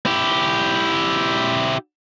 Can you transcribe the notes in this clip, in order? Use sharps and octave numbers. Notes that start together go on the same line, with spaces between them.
E4 G4